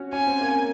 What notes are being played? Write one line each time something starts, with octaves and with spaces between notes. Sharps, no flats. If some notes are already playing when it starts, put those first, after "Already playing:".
Already playing: C#4 F#4
C#4 G#5
C4
A#3